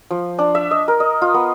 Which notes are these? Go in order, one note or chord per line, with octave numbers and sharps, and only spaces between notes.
F3
D4
E5
D#5
A#4
D#5
F4
B3